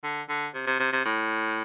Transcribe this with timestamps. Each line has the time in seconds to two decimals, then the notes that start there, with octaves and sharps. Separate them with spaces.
0.04 D3
0.29 D3
0.55 C3
0.67 C3
0.80 C3
0.93 C3
1.05 A2